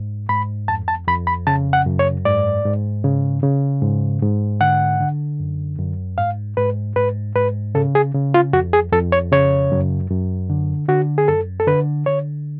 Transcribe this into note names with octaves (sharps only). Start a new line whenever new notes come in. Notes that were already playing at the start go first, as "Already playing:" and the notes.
Already playing: G#2
G#2 B5
F2 A5
A5
F2 B5
B5
C#3 A5
F#5
F#2
C#5
G#2 D5
G#2
C#3
C#3
G#2
G#2
D3 F#5
D3
F#2
F#2
G#2 F5
G#2 B4
G#2 B4
G#2 B4
C#3 A4
G#4
C#3
F4
F2 F#4
G#4
F2 A4
C#5
C#3 C#5
F#2
F#2
D3
D3 F#4
G#4
F#2 A4
A4
D3 B4
D3 C#5